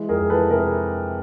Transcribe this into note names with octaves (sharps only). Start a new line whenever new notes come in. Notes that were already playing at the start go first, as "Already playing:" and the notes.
Already playing: E3 G#3
F2 G#4 A#4
E3 A4 B4
C3 G#4 A#4